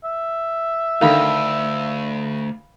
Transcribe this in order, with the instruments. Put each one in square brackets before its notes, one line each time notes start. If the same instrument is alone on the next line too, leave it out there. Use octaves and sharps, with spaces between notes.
[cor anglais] E5
[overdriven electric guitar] D2 [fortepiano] D3 D#3 [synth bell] F5 B5